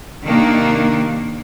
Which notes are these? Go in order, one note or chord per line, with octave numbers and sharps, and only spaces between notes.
C3 D#3 A#3 D4